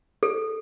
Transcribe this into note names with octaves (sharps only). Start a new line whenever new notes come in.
A4